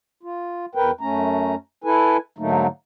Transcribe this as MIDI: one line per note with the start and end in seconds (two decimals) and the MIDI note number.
0.23 0.66 65
0.75 0.91 40
0.75 0.91 70
0.75 0.91 71
0.75 0.91 79
1.01 1.55 42
1.01 1.55 57
1.01 1.55 61
1.01 1.55 82
1.84 2.17 64
1.84 2.17 69
1.84 2.17 71
1.84 2.17 80
2.38 2.67 44
2.38 2.67 50
2.38 2.67 54
2.38 2.67 57
2.38 2.67 58
2.38 2.67 63